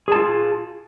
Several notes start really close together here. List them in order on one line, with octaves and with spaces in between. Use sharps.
G#4 A5 F4